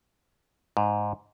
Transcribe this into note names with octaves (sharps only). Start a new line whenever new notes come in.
G#2